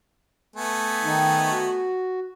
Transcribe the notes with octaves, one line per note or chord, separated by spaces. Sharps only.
A3 B3 G#5
D#3 D#4
F#4